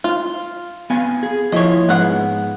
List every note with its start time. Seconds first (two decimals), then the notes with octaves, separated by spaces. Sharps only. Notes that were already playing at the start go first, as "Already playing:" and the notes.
0.04 F4
0.90 B3 F5 G#5
1.23 G#4
1.52 F3 A#3 E4 C#5 D#5
1.89 G#2 G#3 B3 F#5